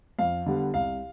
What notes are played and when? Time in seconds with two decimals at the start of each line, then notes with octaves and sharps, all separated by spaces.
0.19 F2 F5
0.46 D3 G3 B3
0.74 C2 F5